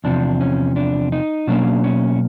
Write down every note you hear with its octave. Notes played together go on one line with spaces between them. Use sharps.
E2 C3 F3 D4
C#4
D4
D#4
B2 F#3 A#3 C#4 D4
C#4